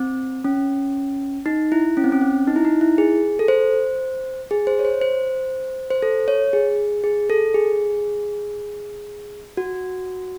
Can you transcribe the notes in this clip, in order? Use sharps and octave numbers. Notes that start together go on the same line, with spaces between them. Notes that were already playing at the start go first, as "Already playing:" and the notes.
Already playing: C4
C#4
D#4
E4
C#4
C4
C#4
C4
D#4
E4
D#4
E4
G#4
A4
C5
G#4
C5
C#5
C5
C5
C5
A4
C#5
G#4
G#4
A4
G#4
F#4